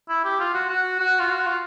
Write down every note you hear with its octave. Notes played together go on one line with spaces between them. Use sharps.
E4
G4
F4
F#4
F#4
F#4
F4
F#4
F4